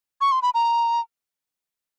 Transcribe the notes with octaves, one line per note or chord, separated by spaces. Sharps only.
C#6
C6
B5
A#5